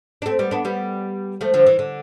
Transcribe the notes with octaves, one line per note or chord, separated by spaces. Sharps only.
D4
A3 C4
G3 B3
B3 D4
G3 B3
F3 A3
D3 F3
E3
D3